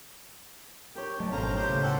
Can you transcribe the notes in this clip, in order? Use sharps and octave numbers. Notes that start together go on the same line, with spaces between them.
G4 A#4 C#5
F#3 A3 D#5 A5
G#1 B2 C#4 A4 C5 F5 A#5
G4 C5
C#2 A2 C#3
A4 C5 F#5 G5